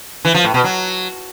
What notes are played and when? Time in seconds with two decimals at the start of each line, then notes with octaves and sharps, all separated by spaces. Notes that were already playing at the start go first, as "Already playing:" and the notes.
0.25 E3
0.34 F3
0.44 A2
0.54 B2
0.64 F#3